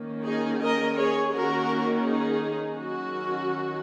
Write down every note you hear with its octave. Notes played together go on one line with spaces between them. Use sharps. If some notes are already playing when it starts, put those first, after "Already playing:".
Already playing: D#3 A#3 C#4
D#4 G#4
A#4 D#5
G#4 C#5
D#3 A#3 C#4 F#4 A#4
D#4 G#4
D#3 F#3 C#4 F#4